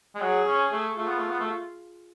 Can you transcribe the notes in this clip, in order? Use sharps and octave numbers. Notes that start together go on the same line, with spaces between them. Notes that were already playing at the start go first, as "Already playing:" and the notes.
G#3
F#3 G#4
C#4
A3
A3 F4
B3
A3
B3
A3